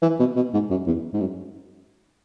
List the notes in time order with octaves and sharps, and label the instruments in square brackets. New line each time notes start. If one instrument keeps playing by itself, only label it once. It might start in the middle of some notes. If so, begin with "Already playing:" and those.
[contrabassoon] E3
B2
B2
G#2
F#2
E2
G#2
F#2